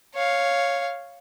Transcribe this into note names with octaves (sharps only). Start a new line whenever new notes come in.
C#5 F5